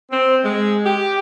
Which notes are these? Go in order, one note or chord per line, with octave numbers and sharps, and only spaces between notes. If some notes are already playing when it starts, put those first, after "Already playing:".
C4
G#3
G4